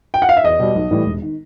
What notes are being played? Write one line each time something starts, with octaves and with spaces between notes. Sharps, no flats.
G5
F#5
F5
E5
E2 D#5
B2 G3
B1
A2 E3 G3
E1
D#3